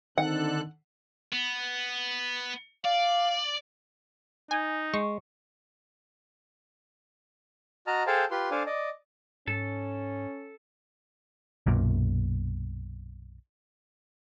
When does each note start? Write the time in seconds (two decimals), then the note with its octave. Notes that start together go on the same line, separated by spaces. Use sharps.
0.18 D3 D#3 C4 D#4 A4 F#5 F#6
1.32 B3
2.85 D5 F5
4.51 D#4 G#5
4.94 G#3 C#6
7.87 F#4 D#5 A5 A#5 F6
8.07 G#4 A4 C5 F5 G5 A5
8.31 F4 G4 B4 C6
8.51 D4 A4 C5 D5 F5 G#5
8.66 D5 D#5
9.47 G#2 C#4 A4
11.66 B1 F#2 A#2